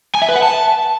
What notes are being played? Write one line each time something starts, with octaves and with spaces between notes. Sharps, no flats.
G#5
E5
B4
F#5
A5